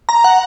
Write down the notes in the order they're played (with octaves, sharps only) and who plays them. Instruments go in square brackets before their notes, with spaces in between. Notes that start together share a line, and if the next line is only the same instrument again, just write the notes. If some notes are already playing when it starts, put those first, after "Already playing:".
[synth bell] A#5
F#5